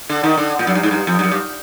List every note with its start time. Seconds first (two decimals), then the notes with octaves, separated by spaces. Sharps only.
0.09 D3
0.23 D#3
0.37 D3
0.59 A#2
0.67 F#2
0.75 G2
0.83 G#2
0.91 G2
1.07 F2
1.19 G2
1.23 F#2
1.31 G2